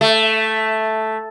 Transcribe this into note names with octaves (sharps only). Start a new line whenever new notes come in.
A3